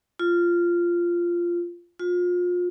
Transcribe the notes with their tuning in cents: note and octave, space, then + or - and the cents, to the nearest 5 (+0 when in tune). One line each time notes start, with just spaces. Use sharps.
F4 -10
F4 +30